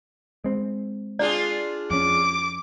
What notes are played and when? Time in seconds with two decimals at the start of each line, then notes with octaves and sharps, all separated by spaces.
0.44 G#3 C4
1.19 D4 F4 G#4 D5
1.91 F2 C#4 D6